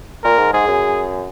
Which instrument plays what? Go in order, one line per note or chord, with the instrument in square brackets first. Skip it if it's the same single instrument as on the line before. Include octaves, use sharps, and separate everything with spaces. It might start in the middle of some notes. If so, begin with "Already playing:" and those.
[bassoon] A#2 [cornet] A#4
[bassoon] G#2
[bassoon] G#2 [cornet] G#4
[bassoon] F#2